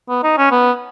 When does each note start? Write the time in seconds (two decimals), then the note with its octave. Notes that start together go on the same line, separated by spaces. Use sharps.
0.09 B3
0.23 D#4
0.37 C#4
0.51 B3